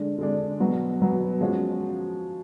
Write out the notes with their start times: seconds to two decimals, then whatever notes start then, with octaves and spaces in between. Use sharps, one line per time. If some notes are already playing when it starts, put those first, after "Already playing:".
Already playing: D3 G#3 D4
0.18 D3 G#3 D4
0.60 B2 F#3 B3 F#4
1.00 B2 F#3 B3 F#4
1.41 F3 G#3 C#4 F#4